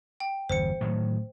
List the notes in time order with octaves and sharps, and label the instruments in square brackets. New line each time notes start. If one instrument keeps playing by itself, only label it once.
[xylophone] G5
[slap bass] G1 E2 [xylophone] C5 C#7
[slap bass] A2 D#3 F#3